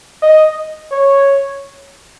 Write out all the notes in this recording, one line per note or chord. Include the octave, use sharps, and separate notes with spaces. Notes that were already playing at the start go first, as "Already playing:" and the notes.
D#5
C#5